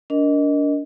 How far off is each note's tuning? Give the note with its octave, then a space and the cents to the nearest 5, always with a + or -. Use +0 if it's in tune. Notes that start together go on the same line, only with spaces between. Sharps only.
D4 -35 A#4 +10 D#5 +0